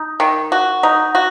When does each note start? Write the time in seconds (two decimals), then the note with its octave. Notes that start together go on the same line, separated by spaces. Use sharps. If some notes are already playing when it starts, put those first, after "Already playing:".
Already playing: D#4
0.20 D#3
0.52 F#4
0.83 D#4
1.15 F#4